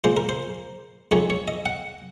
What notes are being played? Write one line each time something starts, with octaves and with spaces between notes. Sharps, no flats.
A#2 G#3 C5
A#4
C5
F2 D#3 G#3 C#5
C#5
D#5
F#5